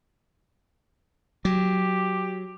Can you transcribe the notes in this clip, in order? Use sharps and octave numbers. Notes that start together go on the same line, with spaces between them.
F#3 G4